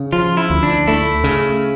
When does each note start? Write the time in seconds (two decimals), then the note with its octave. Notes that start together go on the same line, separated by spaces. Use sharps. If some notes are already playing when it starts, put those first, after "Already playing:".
Already playing: C#3
0.13 F3 F4
0.37 E4
0.50 D2
0.63 D4
0.87 A3 E4
1.24 C#3